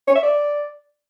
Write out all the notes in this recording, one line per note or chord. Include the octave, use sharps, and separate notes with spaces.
C#5
E5
D5